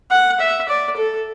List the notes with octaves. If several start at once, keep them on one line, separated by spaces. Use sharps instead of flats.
F#5
E5
D5
A4